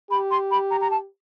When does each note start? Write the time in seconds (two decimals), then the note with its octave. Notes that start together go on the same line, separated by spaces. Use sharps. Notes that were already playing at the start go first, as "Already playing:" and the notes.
0.11 G4 B5
0.31 C6
0.51 B5
0.71 A#5
0.81 A#5
0.91 A5